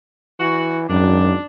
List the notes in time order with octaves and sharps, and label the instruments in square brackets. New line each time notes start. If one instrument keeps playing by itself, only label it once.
[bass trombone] E3 [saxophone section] F#4
[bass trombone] G#1 [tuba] F#2 [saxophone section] D4